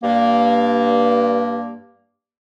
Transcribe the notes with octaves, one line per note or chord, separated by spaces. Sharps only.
G2 A#3